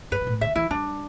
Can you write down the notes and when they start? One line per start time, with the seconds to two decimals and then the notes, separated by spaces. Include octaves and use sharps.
0.11 G2 B4
0.21 B2
0.27 A2
0.41 D3 E5
0.56 E3 E4
0.71 G3 D4